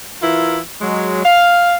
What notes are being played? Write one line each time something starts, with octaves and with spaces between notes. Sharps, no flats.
E3 E4 F4 A#4
F#3 G#3
F5